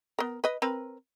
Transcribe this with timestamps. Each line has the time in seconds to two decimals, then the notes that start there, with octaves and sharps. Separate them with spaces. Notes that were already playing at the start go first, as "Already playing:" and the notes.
0.19 B3 A#4
0.44 B4 D#5
0.62 C4 A#4 B4